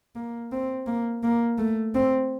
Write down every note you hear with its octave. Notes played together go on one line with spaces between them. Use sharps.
A#3
C4
A#3
A#3
A3
C4